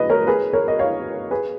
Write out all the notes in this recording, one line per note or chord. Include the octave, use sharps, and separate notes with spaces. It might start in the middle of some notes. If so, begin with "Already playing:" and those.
Already playing: G#4 B4 D#5
A#4 C#5
G#4 B4
A#4 C#5
D#5
C#5 F5
G#4 B4